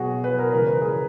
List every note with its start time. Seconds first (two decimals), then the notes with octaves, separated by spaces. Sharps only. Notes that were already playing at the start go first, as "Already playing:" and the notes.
Already playing: B2 F#3 B3 F#4 G#4
0.24 B4
0.39 A#4
0.53 C#3 E3 G#3 A#4
0.67 B4
0.81 G#4